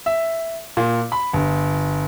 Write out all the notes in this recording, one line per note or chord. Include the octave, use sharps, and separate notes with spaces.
E5
A#2
B5
G1